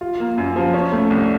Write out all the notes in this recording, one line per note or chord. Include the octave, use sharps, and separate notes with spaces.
F4
A#3
F#2
F3
C#4
A3
C2